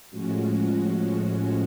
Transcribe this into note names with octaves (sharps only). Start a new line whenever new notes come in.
A2 F3 G#3 C#4 F#4